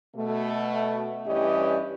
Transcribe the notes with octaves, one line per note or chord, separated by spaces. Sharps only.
B2 A3
G2 E3 C#4 G4 D5 D#5